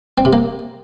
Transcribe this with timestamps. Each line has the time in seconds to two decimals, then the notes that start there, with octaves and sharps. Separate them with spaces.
0.18 C4
0.25 C3
0.33 A#3